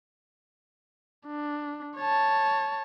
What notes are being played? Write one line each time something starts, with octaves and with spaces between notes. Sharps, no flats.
D4
C#5 A5